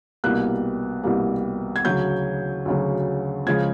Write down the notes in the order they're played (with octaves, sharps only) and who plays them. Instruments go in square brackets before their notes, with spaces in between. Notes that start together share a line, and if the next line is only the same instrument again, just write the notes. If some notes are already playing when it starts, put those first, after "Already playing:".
[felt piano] C2 B2 G3 A#3 F#6
C2 B2 G3 A#3
G#6
D2 C#3 F#3 G6
D2 C#3 F#3
C#3 F3 G#3 G#6